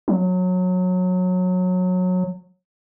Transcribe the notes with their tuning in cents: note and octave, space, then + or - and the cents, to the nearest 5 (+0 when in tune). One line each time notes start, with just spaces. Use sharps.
F#3 -20